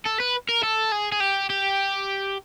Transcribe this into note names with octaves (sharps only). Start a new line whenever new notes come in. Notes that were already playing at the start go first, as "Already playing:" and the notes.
A4
B4
A#4
A4
G#4
G#4
G4
G4